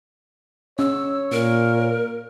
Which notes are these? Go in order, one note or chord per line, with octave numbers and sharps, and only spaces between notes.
C#4 C#5 E6
A#2 A#4